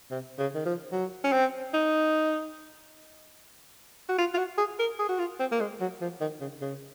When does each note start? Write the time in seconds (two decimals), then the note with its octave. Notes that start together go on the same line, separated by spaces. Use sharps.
0.11 C3
0.38 C#3
0.55 D#3
0.65 F3
0.92 F#3
1.24 C#4
1.33 C4
1.74 D#4
4.09 F#4
4.18 F4
4.34 F4
4.38 F#4
4.58 G#4
4.79 A#4
4.99 G#4
5.09 F#4
5.19 F4
5.40 C4
5.51 A#3
5.61 G#3
5.80 F#3
6.01 F3
6.20 D#3
6.41 C#3
6.61 C#3